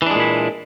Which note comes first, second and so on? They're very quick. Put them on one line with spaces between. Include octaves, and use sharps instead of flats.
E3 D4 G#3 A#2 E4